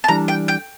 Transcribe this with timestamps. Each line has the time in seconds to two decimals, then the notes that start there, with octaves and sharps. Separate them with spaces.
0.04 A5
0.08 E3 G3 D4 A#5
0.28 G5
0.48 G5